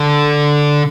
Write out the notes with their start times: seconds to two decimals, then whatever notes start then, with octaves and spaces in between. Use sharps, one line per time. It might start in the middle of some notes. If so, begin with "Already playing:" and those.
Already playing: D3